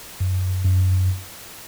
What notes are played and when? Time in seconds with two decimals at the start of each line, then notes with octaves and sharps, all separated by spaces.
0.20 F#2
0.65 F#2